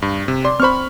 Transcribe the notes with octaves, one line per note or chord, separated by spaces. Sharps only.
G2
C3
D5 C6
C4 C5 B5 C#6 F6